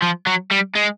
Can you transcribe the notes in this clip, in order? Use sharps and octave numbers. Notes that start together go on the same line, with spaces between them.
F3
F#3
G3
G#3